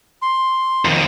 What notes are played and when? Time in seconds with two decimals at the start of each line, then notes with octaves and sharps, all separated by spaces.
0.22 C6
0.85 F2 D#3